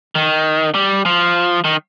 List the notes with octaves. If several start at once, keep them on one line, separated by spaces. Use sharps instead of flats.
D#3
G3
F3
D#3